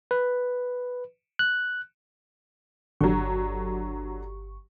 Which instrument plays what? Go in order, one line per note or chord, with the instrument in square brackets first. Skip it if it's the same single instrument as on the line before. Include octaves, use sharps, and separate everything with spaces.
[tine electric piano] B4
F#6
[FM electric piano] G1 G4 C#6 [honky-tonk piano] D3 F#3